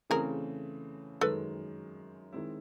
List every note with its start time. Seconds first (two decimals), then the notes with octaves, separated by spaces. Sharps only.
0.10 C#3 E3 A3 C4 G#4 A#4
1.21 F#2 D#3 G#3 A4 B4
2.33 D#3 G#3 C4 E4